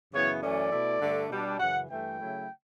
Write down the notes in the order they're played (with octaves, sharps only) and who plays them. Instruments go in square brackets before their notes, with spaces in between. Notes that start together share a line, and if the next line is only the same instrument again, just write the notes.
[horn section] F#2 C#3 E3 B3 E4 C#5
F#2 E3 A3 C#4 D5
B2 A3 E4
G2 D3 A3 D4
B2 G3 D4
F#2 C#3 E3 F#5
G2 E3 A3 G5
C#3 F#3 A3 E4